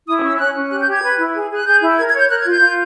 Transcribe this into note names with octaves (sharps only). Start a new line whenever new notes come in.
E4 D#6
D#6
C#4
E6
C#4 F#6
C#4
G4 F#6
G6
G4
G#6
B4
E4
G#4
G#4 F#6
G#4 G6
E4
A#4 G#6
G#6
C#5
G6
A#4 F#6
G#6
F4
G6
F4